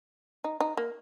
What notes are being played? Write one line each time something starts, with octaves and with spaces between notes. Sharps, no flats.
D#4
D#4
A#3